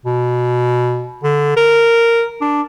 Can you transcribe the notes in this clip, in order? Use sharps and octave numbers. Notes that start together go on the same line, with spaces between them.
B2
D3
A#4
D4